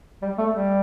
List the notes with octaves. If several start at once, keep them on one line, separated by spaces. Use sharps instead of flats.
G3
A3
G3